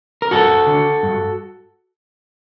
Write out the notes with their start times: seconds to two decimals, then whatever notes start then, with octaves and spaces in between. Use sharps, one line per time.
0.22 A#4
0.31 G2 F#4 A4
0.67 D3
1.03 G2